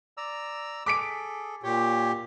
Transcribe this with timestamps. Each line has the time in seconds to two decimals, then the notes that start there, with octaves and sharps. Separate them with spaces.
0.17 D5 A#5 E6
0.86 G#4 A4 D6 B6 D7
1.63 A#2 G4 C#5